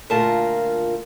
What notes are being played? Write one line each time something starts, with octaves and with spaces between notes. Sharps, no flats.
D2 A#2 A#3 F4 A#4 A5